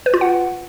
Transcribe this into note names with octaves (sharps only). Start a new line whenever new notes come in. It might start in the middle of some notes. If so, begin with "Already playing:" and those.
B4
F4
F#5